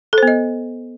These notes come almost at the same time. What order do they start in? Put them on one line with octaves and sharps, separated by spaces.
A4 C5 B3 D#5